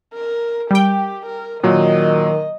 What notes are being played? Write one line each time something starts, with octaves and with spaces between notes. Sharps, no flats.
A#4
G3 G4 G5
A#4
A#2 D#3 F#3 D#5